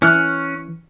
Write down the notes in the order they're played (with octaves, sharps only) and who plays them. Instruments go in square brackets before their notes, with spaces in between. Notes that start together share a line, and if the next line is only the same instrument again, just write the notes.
[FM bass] E3 [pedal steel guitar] C#4 F6 F#6